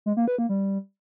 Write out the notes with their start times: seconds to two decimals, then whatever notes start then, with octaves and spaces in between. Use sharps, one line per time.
0.06 G#3
0.17 A#3
0.28 B4
0.38 A#3
0.49 G3